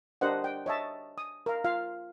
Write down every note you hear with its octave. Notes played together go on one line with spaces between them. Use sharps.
D4 G4 A#4 C5 D#5 F#5
G5
C#5 D#5 E5 A5
D#6
A#4 F5
F4 F5